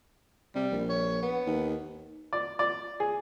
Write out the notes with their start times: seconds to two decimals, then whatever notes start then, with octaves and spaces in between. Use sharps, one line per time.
0.55 C3 G3
0.72 A#1
0.89 C#5
1.23 B3
1.47 D#2
2.33 D5
2.59 D5
3.00 G#4